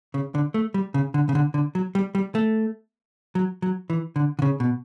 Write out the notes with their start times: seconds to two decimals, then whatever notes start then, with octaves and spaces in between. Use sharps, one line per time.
0.14 C#3
0.35 D3
0.54 A3
0.74 G3
0.94 C#3
1.14 D3
1.29 C#3
1.35 D3
1.54 D3
1.75 F#3
1.95 G3
2.15 G3
2.35 A3
3.35 F#3
3.62 F#3
3.90 E3
4.16 D3
4.39 D3
4.42 C#3
4.60 B2